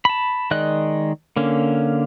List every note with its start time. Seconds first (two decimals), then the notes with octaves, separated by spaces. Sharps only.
0.05 A5 B5
0.51 D#3 G#3 D5 D#5 F#6
1.36 D3 A#3 C#4